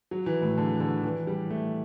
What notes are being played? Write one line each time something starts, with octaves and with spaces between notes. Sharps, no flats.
F#3
E3
A2
D3
D3
E3
G3
A3